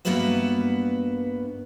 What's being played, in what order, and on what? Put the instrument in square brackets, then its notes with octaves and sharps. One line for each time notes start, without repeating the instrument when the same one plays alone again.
[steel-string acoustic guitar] G2 A#3 B3 F#4 B4 E5